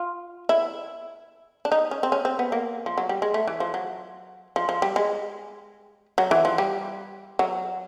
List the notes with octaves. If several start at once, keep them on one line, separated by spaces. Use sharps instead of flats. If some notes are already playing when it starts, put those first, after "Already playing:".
Already playing: F4
E4
D4
D#4
C#4
C4
C#4
C4
B3
A#3
F3
F#3
G3
G#3
A3
E3
F3
F#3
F3
F3
G3
G#3
F#3
E3
F3
G3
F#3